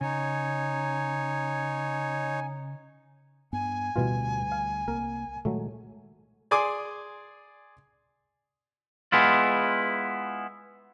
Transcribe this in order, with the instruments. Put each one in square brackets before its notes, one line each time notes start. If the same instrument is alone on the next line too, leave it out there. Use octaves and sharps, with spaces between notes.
[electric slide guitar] C#3 [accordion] D#4 C#5 [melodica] G#5
[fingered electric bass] G2 B3 [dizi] G#5
[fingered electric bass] D2 G3 [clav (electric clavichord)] B2 E3 F4
[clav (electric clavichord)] F5
[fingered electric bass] C2 A#3 [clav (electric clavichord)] A#4
[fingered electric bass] A#2 D#3 G#3 [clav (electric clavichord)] F#3 A3
[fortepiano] G#4 D5 G#5 C6 D6
[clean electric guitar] G#3 B3 E4 F4